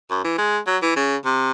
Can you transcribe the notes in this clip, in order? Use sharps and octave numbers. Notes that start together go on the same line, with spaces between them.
F#2
E3
G#3
F#3
E3
C#3
C3